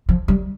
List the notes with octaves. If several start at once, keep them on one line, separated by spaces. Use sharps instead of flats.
F3
G3